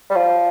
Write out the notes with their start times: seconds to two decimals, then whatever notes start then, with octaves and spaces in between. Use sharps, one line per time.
0.10 G3
0.16 F3